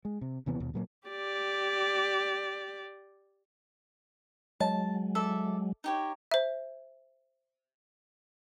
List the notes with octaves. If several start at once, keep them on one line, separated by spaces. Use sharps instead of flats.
G#3
C3
D#2 C3 E3 B3
D#2 B2
A#2 F#3 A3 A#3
G4 D5
F#3 G#3 A5
A4 D5 E5
D#4 G4 C#5
C5 E5